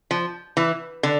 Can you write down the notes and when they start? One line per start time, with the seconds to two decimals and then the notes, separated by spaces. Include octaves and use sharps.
0.11 F3
0.57 E3
1.03 D3